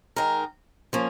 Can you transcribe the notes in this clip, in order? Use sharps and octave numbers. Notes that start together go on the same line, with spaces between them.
D#3 G#3 D#4 A#4
F3 A#3 C#4